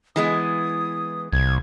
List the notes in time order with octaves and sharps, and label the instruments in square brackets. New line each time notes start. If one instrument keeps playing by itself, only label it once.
[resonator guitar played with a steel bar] E3 G#3 B3 [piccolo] D#6
[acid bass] C2 [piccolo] G#6